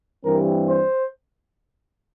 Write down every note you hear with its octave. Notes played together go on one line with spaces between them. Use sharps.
G2 E3 G3 C4 A#4
C5